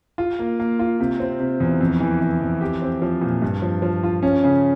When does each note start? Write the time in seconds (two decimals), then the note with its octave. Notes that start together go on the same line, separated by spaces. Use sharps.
0.18 F4
0.39 A#3
0.60 A#3
0.79 F4
1.00 C3
1.20 C4
1.40 C3
1.60 E2
1.81 F2
2.00 E3
2.21 E3
2.41 F2
2.61 G4
2.82 C4
3.02 F3
3.21 A#2
3.42 G2
3.62 F3
3.82 F3
4.03 F4
4.23 C#4
4.44 C#3